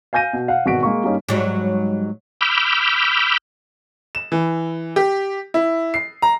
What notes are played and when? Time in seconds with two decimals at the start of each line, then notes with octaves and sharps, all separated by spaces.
0.13 F5 G#5 G6 A#6 D#7
0.33 B2
0.48 F5 F#5
0.66 G#1 B2 F#4 B6 D7
0.83 G#3 A#3 C#6
1.03 G2 G3 A#3 C#4 D#4
1.28 G#2 F#3 G3
2.41 B5 D6 E6 F6 G6
4.15 E7
4.32 E3
4.96 G4
5.54 E4
5.94 C7
6.22 A#5